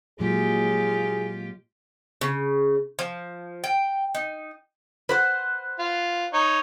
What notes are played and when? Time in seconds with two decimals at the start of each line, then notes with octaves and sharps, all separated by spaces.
0.20 A#2 F#3 G#3 F4 G4 G#4
2.21 C#3
2.99 F3
3.64 G5
4.15 D#4
5.09 B4 C5 F#5
5.79 F4
6.33 D#4 C#5